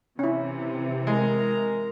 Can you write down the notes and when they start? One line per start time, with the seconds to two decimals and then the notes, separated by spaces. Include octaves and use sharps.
0.19 C3 E3 C#4 E4
1.07 G#3 A#4 A#5